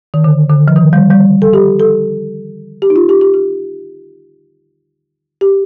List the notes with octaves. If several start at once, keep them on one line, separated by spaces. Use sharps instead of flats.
D#3
D3
D3
F3
D#3
G3
G3
A4
G4
A4
G4
D#4
F4
G4
G4
G4
G4